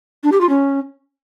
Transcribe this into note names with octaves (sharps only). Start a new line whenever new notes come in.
D4
G4
F4
C#4